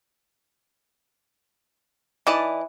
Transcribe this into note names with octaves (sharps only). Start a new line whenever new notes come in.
E3 D#4 D5 A5